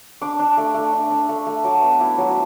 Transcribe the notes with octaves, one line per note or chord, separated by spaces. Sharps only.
D4 D6
D4
A3
A3
D4
D4
A3
A3
F#3 D6
B3
E4 D6
F#3